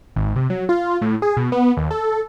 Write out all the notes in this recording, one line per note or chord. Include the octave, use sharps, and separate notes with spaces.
G#1
C3
F#3
F4
A2
G#4
B2
B3
D#2
A4